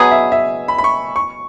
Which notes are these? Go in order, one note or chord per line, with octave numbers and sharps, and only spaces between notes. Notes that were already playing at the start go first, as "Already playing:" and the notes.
Already playing: B2 F#3 B3 G#4 G#5
E5
E5
B5
B5
C#6
C#6